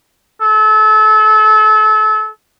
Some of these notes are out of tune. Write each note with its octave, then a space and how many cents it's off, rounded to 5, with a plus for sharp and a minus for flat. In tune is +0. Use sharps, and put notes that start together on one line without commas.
A4 -30